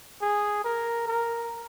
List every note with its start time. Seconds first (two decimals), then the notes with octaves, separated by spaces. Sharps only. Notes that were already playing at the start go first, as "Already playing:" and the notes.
0.22 G#4
0.64 A#4
1.08 A#4